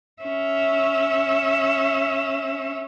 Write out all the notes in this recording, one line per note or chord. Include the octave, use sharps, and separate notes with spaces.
C#4 E5